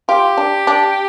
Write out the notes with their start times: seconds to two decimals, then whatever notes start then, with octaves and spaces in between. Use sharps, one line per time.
0.09 F4 G4
0.38 D4
0.67 D4